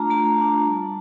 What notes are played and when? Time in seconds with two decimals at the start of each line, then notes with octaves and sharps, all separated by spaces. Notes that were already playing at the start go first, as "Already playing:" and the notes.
Already playing: A3 D4 F4 A5 A#5
0.10 A3 A5
0.37 D4 F4
0.64 G3